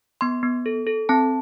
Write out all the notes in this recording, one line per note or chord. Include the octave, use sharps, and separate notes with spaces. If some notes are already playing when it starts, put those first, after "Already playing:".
B3 C6
B3
A4
A4
C4 A5